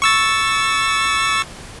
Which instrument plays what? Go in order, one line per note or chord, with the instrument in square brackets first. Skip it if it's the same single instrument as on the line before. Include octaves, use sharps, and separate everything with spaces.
[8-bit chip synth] C#6 E6 A6